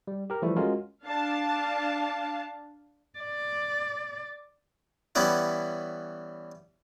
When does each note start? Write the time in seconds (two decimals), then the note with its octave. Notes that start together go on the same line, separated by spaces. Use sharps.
0.07 G3
0.30 G4 A#4
0.42 E3 F3 G3 A3 E4
0.56 G#3 C#4 F4 F#4 A#4
1.03 D4 F5 A5
3.19 D5
5.15 E3 G3 B3 C#4 E4